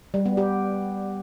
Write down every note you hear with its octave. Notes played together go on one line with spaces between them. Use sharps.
G3
B3
G4